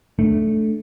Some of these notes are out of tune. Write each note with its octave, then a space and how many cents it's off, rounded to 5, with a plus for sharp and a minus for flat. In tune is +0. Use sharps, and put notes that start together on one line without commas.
A3 -10 D4 +0